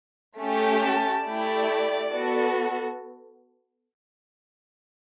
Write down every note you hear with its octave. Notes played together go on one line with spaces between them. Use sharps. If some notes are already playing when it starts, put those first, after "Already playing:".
A3 C#4 G4
A5
A3 E4 G4 D5
B3 F#4 A4